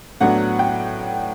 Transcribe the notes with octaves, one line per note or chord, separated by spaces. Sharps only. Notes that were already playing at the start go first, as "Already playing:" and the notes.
A2 F#3 B3 D4 F#5
G5